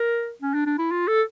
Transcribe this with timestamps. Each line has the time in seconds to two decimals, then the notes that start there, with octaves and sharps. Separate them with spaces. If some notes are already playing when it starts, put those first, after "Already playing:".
Already playing: A#4
0.42 C#4
0.54 D4
0.66 D4
0.79 E4
0.91 F4
1.08 A4